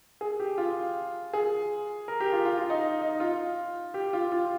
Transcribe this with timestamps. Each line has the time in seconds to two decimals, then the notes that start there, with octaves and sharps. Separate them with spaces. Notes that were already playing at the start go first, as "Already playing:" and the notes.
0.21 G#4
0.40 G4
0.58 F4
1.33 G#4
2.08 A#4
2.20 G4
2.32 F4
2.45 F4
2.58 F4
2.70 D#4
3.02 D#4
3.20 F4
3.94 G4
4.13 F4
4.32 F4